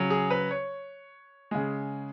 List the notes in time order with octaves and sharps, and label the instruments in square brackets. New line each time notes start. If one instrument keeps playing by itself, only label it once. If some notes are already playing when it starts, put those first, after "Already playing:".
Already playing: [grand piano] C#3 F#3
G#4
B4
C#5
C#3 G#3